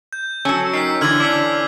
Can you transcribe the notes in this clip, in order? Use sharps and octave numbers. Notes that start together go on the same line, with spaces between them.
G6
F#3 C#4 A4 E6
D#4 A#4 G5 B6 C7
D3 E3 F6 G#6 F#7
C#4 D4 D6 B6